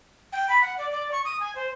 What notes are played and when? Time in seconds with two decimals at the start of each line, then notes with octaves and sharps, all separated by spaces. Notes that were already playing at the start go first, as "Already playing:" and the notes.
0.33 G5
0.49 B5
0.62 F#5
0.78 D5
0.91 D5
1.12 C#6
1.25 D#6
1.40 G#5
1.55 C5